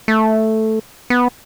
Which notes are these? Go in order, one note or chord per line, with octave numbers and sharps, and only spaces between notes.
A3
B3